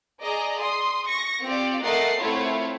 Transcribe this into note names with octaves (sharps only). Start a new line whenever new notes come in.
G#4 D5 D#5 A#5
C6 D#6
C#6 A#6
C4 F4 G4 D5
A3 A#4 D#5 F#5 A6 C7
A3 C4 E4 F4 C#5